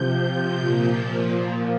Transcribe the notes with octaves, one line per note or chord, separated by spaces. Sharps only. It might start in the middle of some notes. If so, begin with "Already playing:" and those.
Already playing: C3 F3 G6
G6
A#2 F3